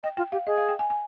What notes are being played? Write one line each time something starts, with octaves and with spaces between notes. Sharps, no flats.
D#5 G5
F4 G5
G4 F5
G#4 D#5
F5
G5
G#5
G#5